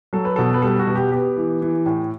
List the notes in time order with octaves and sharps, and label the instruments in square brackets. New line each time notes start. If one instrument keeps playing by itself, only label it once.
[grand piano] F#3 A4
B4
B2 A4
B4
G3 A4
F#4
B2
G4
B3 G4
E3
E3
A2